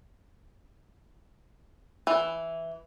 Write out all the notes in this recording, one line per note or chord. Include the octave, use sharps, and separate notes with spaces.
E3